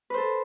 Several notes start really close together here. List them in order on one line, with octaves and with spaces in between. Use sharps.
B4 C5 A4